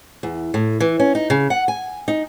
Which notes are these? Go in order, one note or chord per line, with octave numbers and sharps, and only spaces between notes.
E2
A2
E3
C#4
D#4
C#3
F#5
G#5
D#4